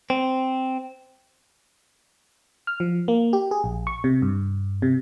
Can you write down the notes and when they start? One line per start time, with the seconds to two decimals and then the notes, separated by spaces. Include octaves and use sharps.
0.10 C4
2.67 F6
2.80 F3
3.08 A#3
3.33 G4
3.51 G#4
3.64 A#1
3.87 C#6
4.04 C3
4.22 G2
4.82 C3